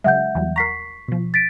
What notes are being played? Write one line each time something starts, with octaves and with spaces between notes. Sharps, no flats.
C#3 F#3 G#3 E5 F#5 G6
E2 F#3 G3
A#4 F#5 A#5 C#6 B6 C7
B2 F3
A6 B6 D7